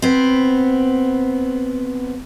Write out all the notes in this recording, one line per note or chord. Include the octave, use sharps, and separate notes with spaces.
B3 C4